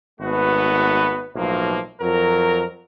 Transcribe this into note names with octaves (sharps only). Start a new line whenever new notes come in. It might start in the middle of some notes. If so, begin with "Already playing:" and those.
G#1 A3 B3 F#4 B4
B1 A2 F3 A#3
F2 F#3 A#4